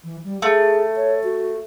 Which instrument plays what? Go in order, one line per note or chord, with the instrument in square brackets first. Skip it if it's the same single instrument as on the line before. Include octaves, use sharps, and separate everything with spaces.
[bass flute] E3
G3
[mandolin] A3 [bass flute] G#4
[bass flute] C#5
F#4